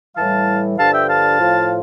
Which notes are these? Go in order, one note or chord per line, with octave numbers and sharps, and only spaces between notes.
A2 E3 G3 F5 A5
G2 D3 F3 F5 A5
E5 G5
F5 A5
A2 F3